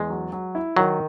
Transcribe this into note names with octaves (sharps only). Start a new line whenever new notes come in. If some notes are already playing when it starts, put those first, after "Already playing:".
Already playing: E2 G#3
F#3
F#3
E4
D#3 F#3